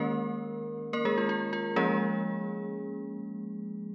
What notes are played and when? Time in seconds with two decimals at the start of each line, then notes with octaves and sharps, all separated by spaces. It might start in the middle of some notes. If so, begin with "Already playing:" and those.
Already playing: D#3 G#3 A#3 C#4 A#4
0.93 A#3 A#4
1.05 G#3 G#4
1.18 F4
1.29 F4
1.53 F4
1.76 F3 G#3 A#3 C#4 G#4